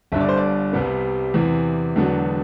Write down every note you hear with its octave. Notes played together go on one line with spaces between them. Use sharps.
G1 G2 D3 E5
D5
C5
D5
C2 C3 G3 B3
E2 C3 E3
E1 E2 D3 F#3 B3